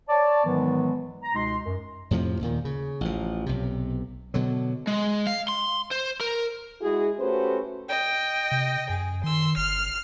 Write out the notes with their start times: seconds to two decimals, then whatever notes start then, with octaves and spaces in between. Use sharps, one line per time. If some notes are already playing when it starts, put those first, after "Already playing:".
0.09 C#5 D5 A5
0.45 G#2 D#3 E3 F#3 G#3 B3
1.22 A#5
1.35 C#2 B2 G#3 D#4 C6
1.64 F#2
2.11 F2 A2 C3 F3
2.41 D#2 A#2 D#3
2.65 C#3
3.01 A1 F3
3.46 B1 C3
4.34 B2 D3 F#3
4.87 G#3
5.27 F5
5.48 C6
5.91 C5
6.21 A#4
6.81 G#3 E4 F#4 G#4
7.19 A3 C#4 F#4 G4 B4 C5
7.89 D#5 G5
8.52 C3
8.90 F#2 G#4
9.23 D#3 C6 E6
9.57 G1 F6 C7